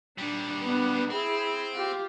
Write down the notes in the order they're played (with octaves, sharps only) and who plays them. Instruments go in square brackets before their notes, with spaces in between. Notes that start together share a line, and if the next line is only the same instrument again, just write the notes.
[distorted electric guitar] A#2 G3 [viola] D4
[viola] B3 D4
[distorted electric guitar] C4 [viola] E4 G#4
[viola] F4 G4